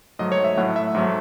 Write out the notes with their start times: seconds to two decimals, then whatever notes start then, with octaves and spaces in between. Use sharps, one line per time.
0.19 G#2 F#3 A3 D#5
0.32 C#5
0.44 E5
0.57 A2 F#3 A3 F#5
0.76 E5
0.95 G#2 F#3 A3